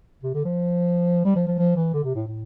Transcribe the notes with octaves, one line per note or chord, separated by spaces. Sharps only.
C3
D3
F3
G3
F3
F3
F3
E3
D3
C3
A2
A2